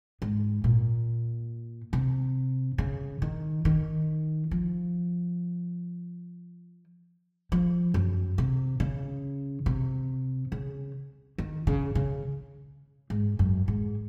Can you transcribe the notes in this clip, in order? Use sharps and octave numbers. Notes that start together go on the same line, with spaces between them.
G#2
A#2
C3
C#3
D#3
D#3
F3
F3
F#2
C3
C#3
C3
C#3
D#3
C#3
C#3
G#2
F#2
G#2